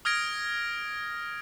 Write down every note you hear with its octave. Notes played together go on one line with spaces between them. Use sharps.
D#6 F6 G#6 A#6 D7